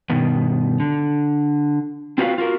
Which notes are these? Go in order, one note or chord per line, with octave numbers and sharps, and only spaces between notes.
G2 B2 D#3
D3
C4 F4 F#4 B4 F5
F4 F#4 A#4